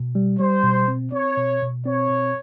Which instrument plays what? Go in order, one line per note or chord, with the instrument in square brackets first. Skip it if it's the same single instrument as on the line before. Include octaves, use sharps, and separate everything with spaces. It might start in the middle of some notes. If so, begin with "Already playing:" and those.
Already playing: [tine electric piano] B2
G3
[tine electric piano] G3 [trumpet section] C5
[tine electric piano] B2
C4
[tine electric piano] C4 [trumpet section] C#5
[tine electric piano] B2
B2
[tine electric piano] C4 [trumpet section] C#5
[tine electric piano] B2